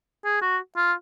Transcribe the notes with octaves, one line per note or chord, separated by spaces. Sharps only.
G#4
F#4
F4